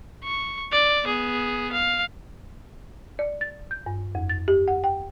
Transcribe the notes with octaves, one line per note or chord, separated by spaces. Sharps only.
C#6
D5
B3 G#4
F5
D5
A6
G6
G2
F2
A6
G4
F#5
G5